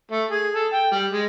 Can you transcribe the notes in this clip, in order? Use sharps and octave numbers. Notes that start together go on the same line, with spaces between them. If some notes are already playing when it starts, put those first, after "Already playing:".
A3
G#4
A4
G5
G3
G#3